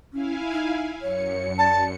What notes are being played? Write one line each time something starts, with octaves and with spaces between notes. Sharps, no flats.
C#4 E4 F5 G#5
D#4
F#2 C#5 C#7
D5 A5